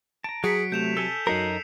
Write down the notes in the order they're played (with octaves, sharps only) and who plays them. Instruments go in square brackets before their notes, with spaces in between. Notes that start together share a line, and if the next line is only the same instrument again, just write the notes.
[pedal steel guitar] A5 A#5 [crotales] D7
[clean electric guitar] F#3 [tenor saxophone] G#4 [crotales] B6 C#7 D7
[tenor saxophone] C3 [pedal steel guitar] A3 [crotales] G6 E7 F7
[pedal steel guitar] A4 G#5 A5 [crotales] E6 C#7 G7
[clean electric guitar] F#2 D#4 A#4 [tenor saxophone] F#3 [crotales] C7 C#7